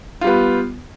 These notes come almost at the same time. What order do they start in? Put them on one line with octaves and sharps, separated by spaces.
F4 G3 B3